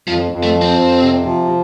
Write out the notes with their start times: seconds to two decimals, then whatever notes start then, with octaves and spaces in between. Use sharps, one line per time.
0.08 F2 F3
0.32 F2
0.43 A3
0.55 F3
0.61 C4
0.78 F2
1.02 C3
1.25 F3